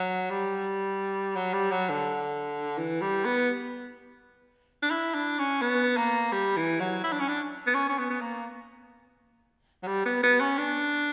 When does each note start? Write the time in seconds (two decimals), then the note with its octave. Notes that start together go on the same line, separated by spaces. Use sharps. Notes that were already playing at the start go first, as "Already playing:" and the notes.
Already playing: F#3
0.30 G3
1.36 F#3
1.53 G3
1.72 F#3
1.90 D3
2.78 E3
3.02 G3
3.25 B3
4.83 D4
4.90 E4
5.14 D4
5.39 C#4
5.61 B3
5.97 A#3
6.32 G3
6.57 E3
6.80 F#3
7.04 E4
7.12 D4
7.20 C#4
7.29 D4
7.67 B3
7.75 C#4
7.89 C#4
7.99 B3
8.10 B3
8.21 A#3
9.83 F#3
9.87 G3
10.06 B3
10.23 B3
10.40 C#4
10.58 D4